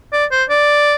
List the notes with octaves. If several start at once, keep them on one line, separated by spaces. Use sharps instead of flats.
D5
C5
D5